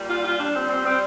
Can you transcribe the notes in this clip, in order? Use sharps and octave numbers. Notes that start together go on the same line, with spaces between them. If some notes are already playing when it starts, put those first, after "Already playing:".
Already playing: A#2 G3
F4
F4
D4
C4
C4
G3 C4